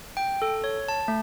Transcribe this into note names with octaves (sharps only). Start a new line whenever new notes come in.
G5
A4
C#5
A5
A3